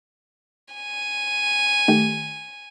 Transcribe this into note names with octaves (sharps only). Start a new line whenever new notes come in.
G#5
D#3 A3 G4